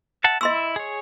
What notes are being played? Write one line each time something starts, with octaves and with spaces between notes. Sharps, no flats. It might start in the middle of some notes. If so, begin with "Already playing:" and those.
E5 F#5 A5
E4 D#5 C6 E6
G#4 C#5